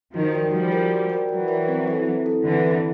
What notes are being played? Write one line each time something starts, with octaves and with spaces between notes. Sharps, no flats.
D#3 F3 F#4
A#4 D5 G5
F3 G3 F#4
A#4 D5 G5
F#4
A#4 D5 G5
E3 F#3 F#4
A#4 D5 G5
C4
E4 A4
C4
E4 A4
D3 E3 C4
E4 A4